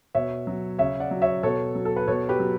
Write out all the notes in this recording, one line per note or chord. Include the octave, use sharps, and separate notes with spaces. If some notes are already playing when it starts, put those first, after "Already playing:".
B2 C#5 E5
F#3
C#3 C#5 E5
D5 F#5
F#3
C#5 E5
B2 A4 C#5
F#3
A4
B4
B2 A4 C#5
G4 B4
F#3